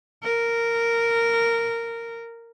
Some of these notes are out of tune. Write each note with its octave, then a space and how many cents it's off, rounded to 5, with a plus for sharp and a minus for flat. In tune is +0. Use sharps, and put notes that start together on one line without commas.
A#4 -10